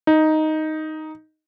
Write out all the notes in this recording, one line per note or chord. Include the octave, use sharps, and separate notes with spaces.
D#4